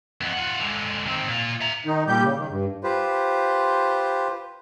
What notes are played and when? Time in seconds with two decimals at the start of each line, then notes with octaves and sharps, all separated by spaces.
0.21 F2 B3
0.33 F4 F#5
0.60 D3 G#3
1.06 D#3 C4
1.28 A#2 F4
1.61 E5 A#5
1.85 D#3 D#4
2.08 A#2 G3 G4 G6
2.23 C#3
2.37 D#3
2.50 G2
2.84 F4 G4 B4 C5